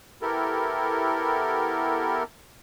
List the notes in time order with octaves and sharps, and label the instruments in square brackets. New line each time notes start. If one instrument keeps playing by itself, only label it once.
[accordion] B3 E4 G4 A4 A#4